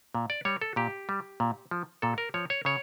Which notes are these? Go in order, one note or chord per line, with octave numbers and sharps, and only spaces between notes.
A#2
D5
G3 C#5
A4
A#2 G4
G3
A#2
F3
A#2 A4
A#4
F3 C#5
C#5
C#3 C#5